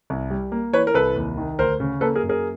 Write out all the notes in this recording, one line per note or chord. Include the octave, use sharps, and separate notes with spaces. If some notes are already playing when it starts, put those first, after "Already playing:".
C2
G3
A#3
E3 B4 C#5
A#4
C2 A4 B4
D#2
D#3
D2 A#4 C5
C#3
A#3 A4 B4
G#4 A#4
F#2
G#4 A#4